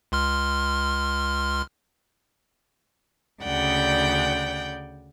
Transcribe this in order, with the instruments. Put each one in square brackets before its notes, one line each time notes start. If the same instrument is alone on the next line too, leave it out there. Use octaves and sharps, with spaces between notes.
[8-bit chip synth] C#2 C6 F6
[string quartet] D2 C#3 D5 F#5 G5 G6